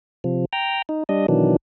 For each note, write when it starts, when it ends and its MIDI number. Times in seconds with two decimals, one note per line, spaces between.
0.24 0.45 48
0.24 0.45 53
0.53 0.82 79
0.53 0.82 82
0.89 1.03 63
1.09 1.26 55
1.09 1.26 62
1.09 1.26 75
1.28 1.56 47
1.28 1.56 51
1.28 1.56 52
1.28 1.56 54
1.28 1.56 62